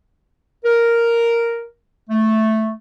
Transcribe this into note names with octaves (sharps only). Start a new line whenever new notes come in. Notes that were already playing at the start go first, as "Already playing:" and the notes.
A#4
A3